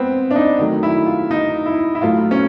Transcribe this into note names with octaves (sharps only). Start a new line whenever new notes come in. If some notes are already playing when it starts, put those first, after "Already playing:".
Already playing: G#3 B3 C4
D4
D#4
D#3 F#3 A3
E4
F4
D#4
E4
E4
A2 F#3 A3 F4
C#4